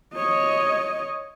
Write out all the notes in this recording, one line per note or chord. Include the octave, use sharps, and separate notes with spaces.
C#5 D#5